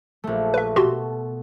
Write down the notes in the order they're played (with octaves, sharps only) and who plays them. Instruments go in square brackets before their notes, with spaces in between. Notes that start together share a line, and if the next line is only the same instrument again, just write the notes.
[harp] A#1 A3
[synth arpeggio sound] B4 E5
[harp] B2 A4 [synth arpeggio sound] F#4 G4 C6